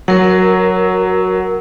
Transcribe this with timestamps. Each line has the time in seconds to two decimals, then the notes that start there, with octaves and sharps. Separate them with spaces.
0.08 F#3 A#4 F#5